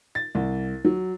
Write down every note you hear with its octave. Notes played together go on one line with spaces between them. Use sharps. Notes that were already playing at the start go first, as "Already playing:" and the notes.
A6
C2
F#3